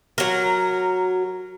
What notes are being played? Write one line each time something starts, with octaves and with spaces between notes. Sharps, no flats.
F#3 A#4